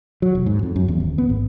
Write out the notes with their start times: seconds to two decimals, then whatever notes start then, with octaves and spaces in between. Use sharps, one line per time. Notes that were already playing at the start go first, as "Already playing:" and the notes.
0.22 F#3
0.35 E1
0.46 G#2
0.63 F2
0.76 F#2
0.88 E2
1.00 D1
1.18 B3
1.30 G#1